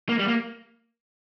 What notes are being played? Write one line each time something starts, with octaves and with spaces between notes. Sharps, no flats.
A#3
G3
A#3